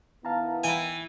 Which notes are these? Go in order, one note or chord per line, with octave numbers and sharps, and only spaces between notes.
D#3 B3 E4 F5 A5 A#5
E3 G5 G#5